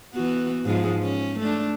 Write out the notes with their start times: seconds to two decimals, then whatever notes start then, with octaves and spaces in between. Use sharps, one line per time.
0.13 E3 B3 F#4
0.66 G#2 F3 G#3
1.03 C#4
1.39 A3 D4